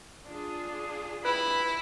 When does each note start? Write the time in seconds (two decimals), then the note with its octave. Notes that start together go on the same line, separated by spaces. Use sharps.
0.24 D4 F4 G#4
1.25 E4 B4 B5